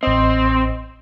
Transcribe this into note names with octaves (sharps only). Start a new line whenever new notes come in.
A1 C4 D#5